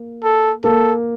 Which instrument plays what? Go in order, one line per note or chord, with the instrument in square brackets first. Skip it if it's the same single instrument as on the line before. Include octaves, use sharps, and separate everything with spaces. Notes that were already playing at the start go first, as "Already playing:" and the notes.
Already playing: [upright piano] A#3
[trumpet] A4
[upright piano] A#3 [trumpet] A4